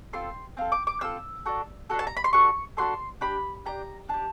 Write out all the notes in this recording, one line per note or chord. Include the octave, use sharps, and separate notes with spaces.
C4 F4 A4 C6
C4 F4 A4
D6
D6
C4 F4 A4 E6
D4 F#4 A4
D4 F#4 A4
A5
A#5
B5
C6
D4 F#4 A4 C#6
D4 F#4 A4 C6
D4 G4 B5
D4 G4 A#5
D4 G4 A5